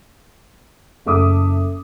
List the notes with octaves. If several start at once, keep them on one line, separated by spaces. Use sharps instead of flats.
F#1 A3 E5 D6 D#6